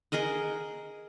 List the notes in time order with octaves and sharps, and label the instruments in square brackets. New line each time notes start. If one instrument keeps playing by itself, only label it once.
[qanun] G#4 A#4 D#5 F#5